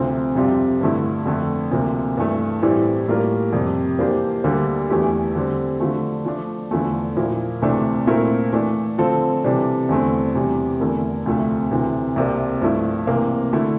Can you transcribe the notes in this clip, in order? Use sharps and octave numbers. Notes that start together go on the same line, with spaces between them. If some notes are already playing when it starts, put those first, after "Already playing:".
Already playing: D2 C3 F3 C4
F2 C3 G3 C4 F4
G2 D3 A3 E4
F2 D3 A3
D2 C3 F3 A#3
G2 E3 A3
A2 E3 G3 C4 E4
A2 G3 A#3 F4 A#4
F2 C3 G3
E3 A#3 D4 G4 C5
D2 D3 G3 A#3
E2 E3 A3 E4 G4
D3 G3 C4
D3 F3 A3
F3 A3 D4
E2 D3 F3 A3
A#2 F3 A#3 E4
D2 C3 E3 A3 D4
A#2 A3 C4 E4 A#4
E3 A3 D4
D3 F3 C4 F4 A4
C3 E3 G3 D4 A4
E2 D3 A3 C4
E2 C3 G3
E2 D3 A3 E4 A#4
D2 C3 F3 A3
D2 C3 E3
C2 C3 G3 A#3
G2 F3 A3 E4
C3 E3 A#3
D3 A3 E4